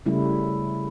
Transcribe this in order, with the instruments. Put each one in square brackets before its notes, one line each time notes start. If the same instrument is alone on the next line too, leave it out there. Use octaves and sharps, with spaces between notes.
[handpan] C#3 G3 A3 E4